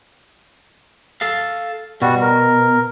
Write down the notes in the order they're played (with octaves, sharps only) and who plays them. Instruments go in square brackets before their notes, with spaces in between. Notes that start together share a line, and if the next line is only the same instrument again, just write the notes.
[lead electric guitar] A4 F5
[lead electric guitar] B2 [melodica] G3 F#4
[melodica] A#4